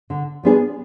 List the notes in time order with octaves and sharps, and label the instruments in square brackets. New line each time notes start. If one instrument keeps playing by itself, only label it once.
[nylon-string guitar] D3
F3 B3 D4 G#4